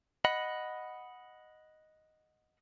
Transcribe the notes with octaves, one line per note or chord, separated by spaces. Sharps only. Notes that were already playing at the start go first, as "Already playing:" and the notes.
D#5 F#5 B5